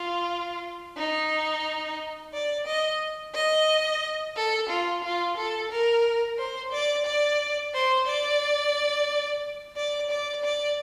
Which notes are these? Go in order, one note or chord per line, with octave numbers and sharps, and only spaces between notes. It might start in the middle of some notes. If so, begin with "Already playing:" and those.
Already playing: F4
D#4
D5
D#5
D#5
A4
F4
F4
A4
A#4
C5
D5
D5
C5
D5
D5
D5
D5